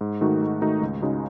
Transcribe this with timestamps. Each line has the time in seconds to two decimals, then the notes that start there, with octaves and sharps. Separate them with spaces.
0.01 G#2
0.21 D#3 A3 D#4 F#4
0.41 G#2
0.61 D#3 A3 D#4 F#4
0.81 C#2
1.01 C#3 G#3 D#4 F#4